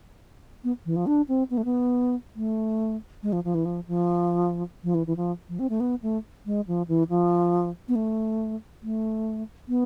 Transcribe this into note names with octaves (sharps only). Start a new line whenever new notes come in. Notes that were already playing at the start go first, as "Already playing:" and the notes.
B3
E3
F3
D4
C4
B3
A3
B3
A3
G#3
F3
F3
E3
F3
F3
F3
E3
E3
F3
F3
C4
A3
B3
A3
G#3
F3
E3
F3
B3
A3
A3
B3